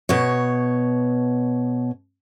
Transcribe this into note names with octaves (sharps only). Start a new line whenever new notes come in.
B2 C#5